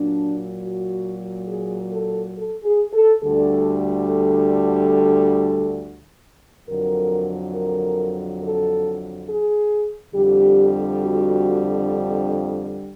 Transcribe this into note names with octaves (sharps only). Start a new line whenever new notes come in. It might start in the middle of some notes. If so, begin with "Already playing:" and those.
Already playing: A#2 F#3 D4
F#4
G#4
A4
A4
G#4
A4
D2 D3 G3 A4
A4
F2 D3 F#3 A#4
A#4
A4
G#4
F2 D3 G3 G4
F#4
D4